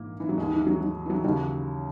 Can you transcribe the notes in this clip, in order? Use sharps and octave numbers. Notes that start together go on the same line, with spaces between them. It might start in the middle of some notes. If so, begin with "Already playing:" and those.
Already playing: A#1 G#2 E3 A#3
E3
F#3
D#2 D#3 G#3
E3
F#3
F#3
E3
F#3
D#2 C#3 E3 F#3